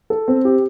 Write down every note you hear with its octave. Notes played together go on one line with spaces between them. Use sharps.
A4
C4
G4